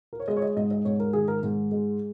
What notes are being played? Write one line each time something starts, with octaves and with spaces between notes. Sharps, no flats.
A#4
C#5
G#3 D#5
C#5
D#5
G#2 D#5
D#5
G#2 C#5
A#4
D#3 G#4
A#4
G#2
G#3